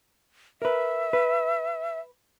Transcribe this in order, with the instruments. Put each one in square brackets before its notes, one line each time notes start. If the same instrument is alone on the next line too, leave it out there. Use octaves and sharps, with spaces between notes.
[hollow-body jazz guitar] A#4 B4 [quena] E5
[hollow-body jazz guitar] B4